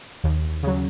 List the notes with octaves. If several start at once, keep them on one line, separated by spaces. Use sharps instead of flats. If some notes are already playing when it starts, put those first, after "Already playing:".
D#2
C#3 F#3